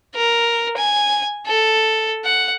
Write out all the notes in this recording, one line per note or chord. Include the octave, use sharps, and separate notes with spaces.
A#4
G#5
A4
F#5